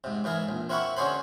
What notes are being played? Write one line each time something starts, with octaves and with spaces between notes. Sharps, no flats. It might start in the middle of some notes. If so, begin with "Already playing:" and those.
G#2 C3
G#2 E3 G#4 A#4
A#1
C4 E4 A#4 F#5 B5 C#6
D3 C#4 F#4 G#4 C5 B5